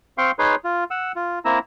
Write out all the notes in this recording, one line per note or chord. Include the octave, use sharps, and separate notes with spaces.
C4 F5 G5 C6 C#6
D#4 G#4 B4 C#5 C6
F4
F#5 E6
F4
A#3 C4 E4 A#5 E6